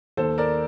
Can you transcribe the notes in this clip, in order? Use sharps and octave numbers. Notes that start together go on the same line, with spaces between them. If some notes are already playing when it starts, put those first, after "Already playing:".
D#2 A4 C5
A#4 D5